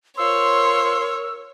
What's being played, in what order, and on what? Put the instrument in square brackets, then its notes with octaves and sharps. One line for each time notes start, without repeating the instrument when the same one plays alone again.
[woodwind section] F4 C5 C6 [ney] A#4 [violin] C#5 [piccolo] E6